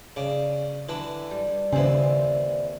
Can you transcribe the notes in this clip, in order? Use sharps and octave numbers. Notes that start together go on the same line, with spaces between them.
C#3 D5
D3 E3
G3 D5
D#2 C#3 E3 C4 C5